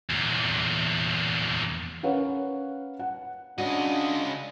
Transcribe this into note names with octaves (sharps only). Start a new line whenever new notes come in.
E2 A#2
C#4 A#4 B4 C#5 F5 F#5
F#5
C#3 D4 F#4 D#5